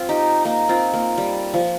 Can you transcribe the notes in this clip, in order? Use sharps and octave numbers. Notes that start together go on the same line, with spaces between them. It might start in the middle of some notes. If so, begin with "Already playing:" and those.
Already playing: C4 F4
D#4 G4
A#3 D#4
C4 F4
A#3
G3
F3